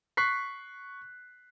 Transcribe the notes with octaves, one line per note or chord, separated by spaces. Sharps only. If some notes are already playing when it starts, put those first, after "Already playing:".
C#6 F#6 B6 C7